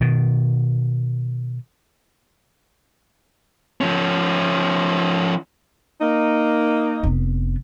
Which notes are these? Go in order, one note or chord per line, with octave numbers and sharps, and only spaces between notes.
B2 D#3
F3 C#4
A#3 D#4
F1 B3